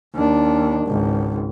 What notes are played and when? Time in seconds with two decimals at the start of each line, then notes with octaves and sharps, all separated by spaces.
0.15 D#2 D4
0.87 G#1 C#2